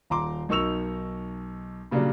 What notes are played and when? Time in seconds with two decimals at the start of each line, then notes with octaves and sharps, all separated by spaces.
0.10 D#1 A#5 C6 D6
0.49 B1 D#4 A#4 C#6 E6 F7
1.91 A#2 C#3 F#3 G3 A#3 D4